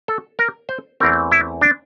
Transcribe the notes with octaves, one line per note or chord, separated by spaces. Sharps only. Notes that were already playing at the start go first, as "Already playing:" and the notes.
A4
A#4
C5
E2 E3 A3 C4 A#4
E4
D4